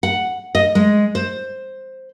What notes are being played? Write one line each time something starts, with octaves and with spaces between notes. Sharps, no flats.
F#5
D#5
G#3
C5